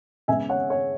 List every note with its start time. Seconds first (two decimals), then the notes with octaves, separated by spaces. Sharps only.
0.28 C#3 G#3 B3 E5 G#5
0.49 C#5 F#5
0.70 C#5